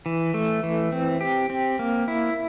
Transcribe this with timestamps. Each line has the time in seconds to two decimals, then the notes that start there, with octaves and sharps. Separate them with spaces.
0.06 E3
0.34 A3
0.63 E3
0.92 C4
1.21 G4
1.50 C4
1.79 A#3
2.08 E4